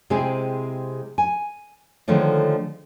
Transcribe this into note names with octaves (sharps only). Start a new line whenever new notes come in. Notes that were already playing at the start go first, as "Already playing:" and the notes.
C3 G#3 C4 E4 G#4
G#5
D3 D#3 F3 G#3 A3 C#4